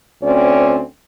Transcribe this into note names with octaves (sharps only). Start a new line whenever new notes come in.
D2 C4 C#4 D5